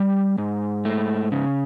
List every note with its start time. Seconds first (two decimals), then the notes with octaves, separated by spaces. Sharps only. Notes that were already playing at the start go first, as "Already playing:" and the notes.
Already playing: G3
0.38 G#2
0.85 A3
1.32 C#3